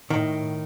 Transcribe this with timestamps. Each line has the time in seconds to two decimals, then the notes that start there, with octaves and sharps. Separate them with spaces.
0.10 A2 D#3